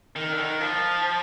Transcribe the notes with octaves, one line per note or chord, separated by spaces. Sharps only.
D#3
D3
D#3
F3